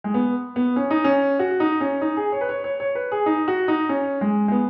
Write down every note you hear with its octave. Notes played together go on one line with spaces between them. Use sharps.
G#3
B3
B3
C#4
D#4
C#4
F#4
D#4
C#4
D#4
G#4
C#5
B4
C#5
C#5
C#5
B4
G#4
D#4
F#4
D#4
C#4
G#3
G#3
B3